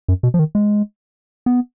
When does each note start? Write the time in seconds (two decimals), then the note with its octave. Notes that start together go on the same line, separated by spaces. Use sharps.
0.08 F#2
0.23 B2
0.34 F3
0.39 D#3
0.55 G#3
1.46 B3